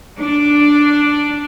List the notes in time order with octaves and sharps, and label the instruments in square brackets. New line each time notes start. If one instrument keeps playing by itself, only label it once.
[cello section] D4